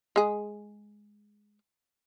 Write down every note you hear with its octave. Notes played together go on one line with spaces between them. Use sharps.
G#3 G#4